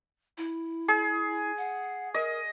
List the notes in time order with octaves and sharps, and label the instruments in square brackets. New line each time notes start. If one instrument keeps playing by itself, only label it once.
[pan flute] E4
[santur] G#4
[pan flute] F#5
[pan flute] A#4 [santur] D#5